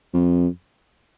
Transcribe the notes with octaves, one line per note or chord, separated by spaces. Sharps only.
F2